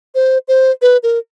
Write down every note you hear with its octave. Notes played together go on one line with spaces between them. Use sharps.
C5
C5
B4
A#4